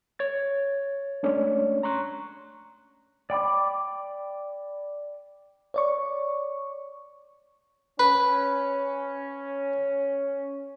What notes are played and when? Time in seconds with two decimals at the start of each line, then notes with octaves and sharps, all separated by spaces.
0.19 C#5 G#6 A6
1.23 G#3 A3 C#4 D4 C#5 D5
1.83 A#5 C6 C#6 F#6
3.30 D5 G5 B5 D6
5.74 C#5 D5 C#6
7.99 C#4 B4